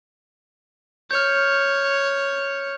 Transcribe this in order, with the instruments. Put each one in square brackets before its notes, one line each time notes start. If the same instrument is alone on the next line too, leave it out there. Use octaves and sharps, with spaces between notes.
[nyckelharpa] C#5 [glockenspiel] F6 G6